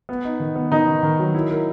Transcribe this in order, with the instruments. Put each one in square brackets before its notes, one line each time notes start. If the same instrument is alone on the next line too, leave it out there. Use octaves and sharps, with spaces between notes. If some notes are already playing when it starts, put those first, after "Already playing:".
[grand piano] B3
D#4
D#3
B3
[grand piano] D#3 [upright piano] D#4
[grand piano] D#3
D#3
F#3
E4
A#4